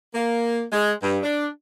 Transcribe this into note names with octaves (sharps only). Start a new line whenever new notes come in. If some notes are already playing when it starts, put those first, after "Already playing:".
A#3
G#3
G2
D4